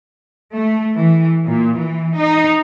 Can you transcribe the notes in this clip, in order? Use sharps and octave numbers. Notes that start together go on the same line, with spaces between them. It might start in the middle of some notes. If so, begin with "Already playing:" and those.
A3
E3
A#2
E3
D#4